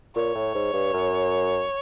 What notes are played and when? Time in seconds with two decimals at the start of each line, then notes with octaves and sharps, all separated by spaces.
0.15 A#2 C#5
0.35 A2
0.55 G#2
0.74 G2
0.94 F#2